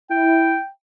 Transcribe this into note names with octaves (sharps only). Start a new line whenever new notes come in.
E4 G5